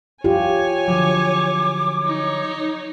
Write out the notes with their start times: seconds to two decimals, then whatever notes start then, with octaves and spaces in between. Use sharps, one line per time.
0.24 F4 G4 C#5 G#5
0.88 D3 F3 F#3 D6
2.02 D#4 C#5